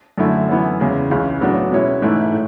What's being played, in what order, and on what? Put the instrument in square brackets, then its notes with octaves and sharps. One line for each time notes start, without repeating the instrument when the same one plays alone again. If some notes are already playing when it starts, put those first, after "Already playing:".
[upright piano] F#2 D3 A3 E4
F#2 E3 B3 E4
E2 C#3 G#3
C#2 C#3 E3
A2 F#3 B3 D4
B2 G#3 C#4 E4
G#2 E3 A3 E4
A2